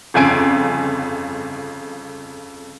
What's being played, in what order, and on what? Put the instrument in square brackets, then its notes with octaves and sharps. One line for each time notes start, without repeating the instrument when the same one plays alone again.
[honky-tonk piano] G1 F2 C#3 G#5 D7